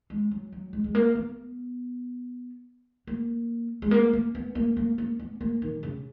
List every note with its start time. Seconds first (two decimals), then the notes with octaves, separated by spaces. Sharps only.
0.10 G#3
0.31 F#3
0.52 F#3
0.73 G#3
0.84 G#3
0.95 A#3
1.15 B3
3.07 A#3
3.82 G#3
3.91 A#3
4.13 A#3
4.35 B3
4.55 A#3
4.77 A#3
4.98 A#3
5.19 B3
5.41 A#3
5.62 D#3
5.83 C#3